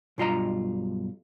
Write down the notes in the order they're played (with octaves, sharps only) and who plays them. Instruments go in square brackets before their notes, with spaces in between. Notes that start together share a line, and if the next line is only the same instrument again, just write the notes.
[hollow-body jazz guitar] B1 G2 F4 D#5 F5 A#5